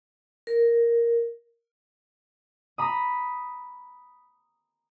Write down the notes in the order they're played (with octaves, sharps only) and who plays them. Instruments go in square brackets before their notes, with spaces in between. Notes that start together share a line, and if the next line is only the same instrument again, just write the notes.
[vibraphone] A#4
[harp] A#5 B5 D#6